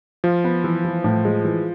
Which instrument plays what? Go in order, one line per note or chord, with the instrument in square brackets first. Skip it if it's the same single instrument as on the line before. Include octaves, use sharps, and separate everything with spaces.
[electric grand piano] F3 [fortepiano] F4
[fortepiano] B3
E3
E3
A2
G#3
E3